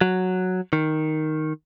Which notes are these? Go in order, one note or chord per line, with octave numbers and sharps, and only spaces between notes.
F#3
D#3